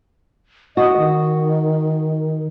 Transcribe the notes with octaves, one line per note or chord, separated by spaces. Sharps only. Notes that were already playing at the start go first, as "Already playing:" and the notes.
F#4 D#5
D#3